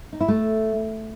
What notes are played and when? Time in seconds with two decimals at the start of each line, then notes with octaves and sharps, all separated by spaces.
0.13 D#4
0.21 E4
0.28 A3